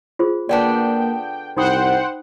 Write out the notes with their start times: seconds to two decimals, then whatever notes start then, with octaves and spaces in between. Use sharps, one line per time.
0.19 F4 G#4 C5
0.49 D3 A#3 B3 D4 D5 G5
1.56 C2 D#4 C5 F#5 G5 B5 D#6